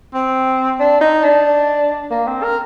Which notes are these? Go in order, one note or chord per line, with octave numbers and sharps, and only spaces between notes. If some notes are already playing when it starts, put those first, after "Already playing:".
C4
D4
D#4
D4
A#3
C4
A#4